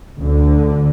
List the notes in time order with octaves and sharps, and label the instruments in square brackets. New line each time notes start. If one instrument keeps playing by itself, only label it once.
[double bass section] D2 D3